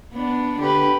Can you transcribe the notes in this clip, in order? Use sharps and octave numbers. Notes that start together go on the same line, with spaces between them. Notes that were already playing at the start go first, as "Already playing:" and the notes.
B3 D4
D3 G4 B4